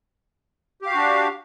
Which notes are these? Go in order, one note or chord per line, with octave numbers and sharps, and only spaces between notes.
D4 F#4 G4 F5